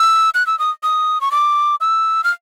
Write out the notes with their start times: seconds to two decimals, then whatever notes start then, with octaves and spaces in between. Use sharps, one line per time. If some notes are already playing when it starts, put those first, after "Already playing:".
Already playing: E6
0.34 F#6
0.47 E6
0.59 D#6
0.83 D#6
1.21 C#6
1.31 D6
1.81 E6
2.24 F6